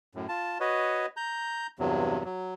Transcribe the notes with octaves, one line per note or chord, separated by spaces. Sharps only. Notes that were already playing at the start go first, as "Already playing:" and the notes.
F#2 A2
F4 A5
F#4 B4 C#5 D#5
A#5 G6
E2 G2 C3 F#3
F#3